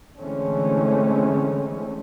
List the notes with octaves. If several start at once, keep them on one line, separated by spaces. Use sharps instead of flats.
D3 E3 G#3 A3 C4 C#4